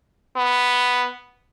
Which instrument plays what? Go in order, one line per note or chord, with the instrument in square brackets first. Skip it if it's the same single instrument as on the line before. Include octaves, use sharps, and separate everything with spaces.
[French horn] B3